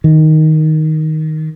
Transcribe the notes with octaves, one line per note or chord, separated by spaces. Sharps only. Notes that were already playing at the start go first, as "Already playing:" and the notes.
D#3